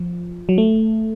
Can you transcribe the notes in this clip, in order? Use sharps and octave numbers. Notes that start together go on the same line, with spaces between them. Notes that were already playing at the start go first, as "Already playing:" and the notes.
Already playing: F3
F#3
A3